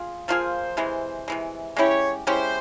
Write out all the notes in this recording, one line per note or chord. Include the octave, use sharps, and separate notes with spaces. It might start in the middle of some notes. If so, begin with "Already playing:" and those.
Already playing: F4 G#4
F3 A#3 F4 G#4 C5
C3 E3 G#3
C3 E3 G#3
G#3 C#4 E4 G4 C#5
G#3 C#4 E4 G4 C5